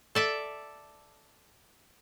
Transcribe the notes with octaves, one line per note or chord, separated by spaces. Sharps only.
A4 D5 E5